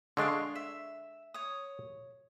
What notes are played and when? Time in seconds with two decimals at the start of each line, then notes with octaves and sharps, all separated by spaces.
0.17 D3 G#3 D4 F5 C6 C#6
0.55 E5
1.34 C#5 D#6